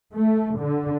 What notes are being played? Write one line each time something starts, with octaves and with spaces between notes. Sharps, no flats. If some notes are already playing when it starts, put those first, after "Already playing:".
A3
D3